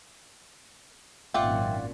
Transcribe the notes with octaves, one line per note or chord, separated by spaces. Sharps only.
G#1 F#2 A#2 F4 D5 E5 F#5 G5